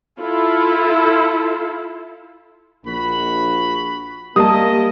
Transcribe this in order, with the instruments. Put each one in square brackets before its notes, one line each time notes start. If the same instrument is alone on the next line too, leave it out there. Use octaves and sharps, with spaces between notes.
[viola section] E4 F4 A4
[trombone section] A#1 [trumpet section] F#4 B5
[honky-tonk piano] G3 [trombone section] A#3 [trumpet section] C#4 E4 D#5 [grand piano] A5 D#6